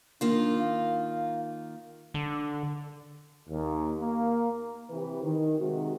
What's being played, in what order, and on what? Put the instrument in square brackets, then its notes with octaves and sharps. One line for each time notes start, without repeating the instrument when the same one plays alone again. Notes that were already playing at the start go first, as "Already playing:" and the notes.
[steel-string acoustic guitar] D#3 A#3 F4 [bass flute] D4
[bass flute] F5
[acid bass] D3
[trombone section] D#2
A#3
[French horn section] C3 E3 G4 B4
D#3
C3 D#3 G#3 F#4